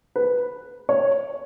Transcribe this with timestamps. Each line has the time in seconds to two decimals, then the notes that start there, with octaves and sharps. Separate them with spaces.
0.16 B4
0.89 C#5